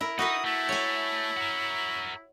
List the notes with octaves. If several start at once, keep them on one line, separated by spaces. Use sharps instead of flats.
E4 A#4
D#4 F#4 A#4 B4 D#6
A3 E4
C#5 G#5
F#4 A#4